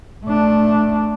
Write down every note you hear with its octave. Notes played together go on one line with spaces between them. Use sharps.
A3 D4